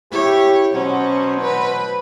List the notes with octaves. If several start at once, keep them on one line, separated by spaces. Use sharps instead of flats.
E4 G4 C#5
B2 F#3 C#4 C5
B4